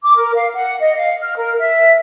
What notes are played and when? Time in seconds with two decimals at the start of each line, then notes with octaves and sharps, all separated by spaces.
0.03 D6
0.17 A#4
0.34 F5
0.54 F#5
0.81 D#5
0.97 F5
1.23 F6
1.37 A#4
1.58 E5